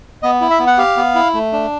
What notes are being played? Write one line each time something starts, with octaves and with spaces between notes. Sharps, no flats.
B3 D#5
E4
E5
B3
F#5
G4 F5
B3
E4
A3
D4